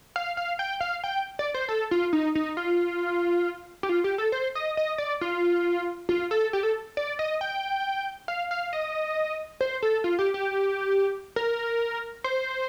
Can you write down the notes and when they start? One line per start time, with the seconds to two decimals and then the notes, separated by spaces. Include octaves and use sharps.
0.16 F5
0.37 F5
0.59 G5
0.81 F5
1.04 G5
1.39 D5
1.54 C5
1.69 A4
1.91 F4
2.13 D#4
2.35 D#4
2.57 F4
3.83 G4
3.89 F4
4.04 G4
4.18 A4
4.32 C5
4.55 D#5
4.77 D#5
4.98 D5
5.21 F4
6.09 F4
6.31 A4
6.53 G4
6.63 A4
6.97 D5
7.19 D#5
7.41 G5
8.28 F5
8.51 F5
8.73 D#5
9.61 C5
9.83 A4
10.04 F4
10.19 G4
10.34 G4
11.36 A#4
12.24 C5